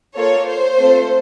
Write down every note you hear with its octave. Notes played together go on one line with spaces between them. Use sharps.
A#3 F4 A4 C#5
C5
A3 C4 F4 A4